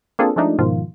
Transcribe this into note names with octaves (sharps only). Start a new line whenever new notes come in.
A#3 C4 D4 F4 G#4 A4
F3 G#3 A3 D4 D#4
G#2 B2 D#3 F3 F4